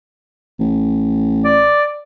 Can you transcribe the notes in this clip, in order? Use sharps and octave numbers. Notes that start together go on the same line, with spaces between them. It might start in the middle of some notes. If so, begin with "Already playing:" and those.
A1
D5